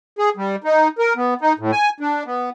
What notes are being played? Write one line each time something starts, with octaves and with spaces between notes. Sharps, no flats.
G#4
G3
D#4
A#4
B3
D#4
A2
G#5
D4
B3